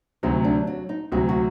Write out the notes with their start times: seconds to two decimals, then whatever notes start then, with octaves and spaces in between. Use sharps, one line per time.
0.23 D2 C3 F#3 D#4
0.45 D4
0.67 F#3
0.89 D#4
1.12 D2 C3 F#3 F#4
1.29 F#4